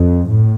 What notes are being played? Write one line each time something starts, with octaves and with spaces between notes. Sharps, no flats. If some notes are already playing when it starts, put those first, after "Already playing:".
Already playing: F2
A2